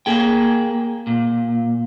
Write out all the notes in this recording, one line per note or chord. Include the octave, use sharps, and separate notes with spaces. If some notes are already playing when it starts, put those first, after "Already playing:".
A#3 G#4 G5
A#2